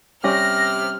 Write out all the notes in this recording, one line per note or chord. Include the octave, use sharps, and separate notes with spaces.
C3 G3 C#4 G4 F6 A#6